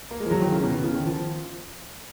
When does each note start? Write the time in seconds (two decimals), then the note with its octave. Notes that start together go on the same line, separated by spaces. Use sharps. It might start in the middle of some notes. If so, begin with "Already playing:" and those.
0.11 A#3
0.20 G#3
0.26 F3
0.31 F#3
0.41 D#3
0.52 C#3
0.64 B2
0.74 B2
0.84 C#3
0.95 D#3
1.06 F3